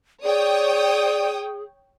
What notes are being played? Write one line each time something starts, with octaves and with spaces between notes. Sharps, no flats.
G#4 C#5 D5 G5 D#6